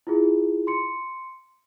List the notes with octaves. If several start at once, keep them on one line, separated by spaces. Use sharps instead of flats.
E4 F4 G#4
C6 C#7